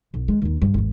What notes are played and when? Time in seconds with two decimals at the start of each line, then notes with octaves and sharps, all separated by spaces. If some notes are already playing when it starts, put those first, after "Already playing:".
0.14 B1
0.28 G#3
0.42 D#2 D#4
0.62 G2 C3
0.74 G#1 E2